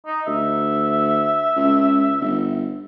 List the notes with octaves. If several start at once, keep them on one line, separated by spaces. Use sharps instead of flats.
D#4
D2 E5
C#2
G1